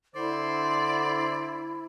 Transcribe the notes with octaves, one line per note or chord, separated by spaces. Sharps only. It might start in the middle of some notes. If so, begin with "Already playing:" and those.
D3 E4 C5 D5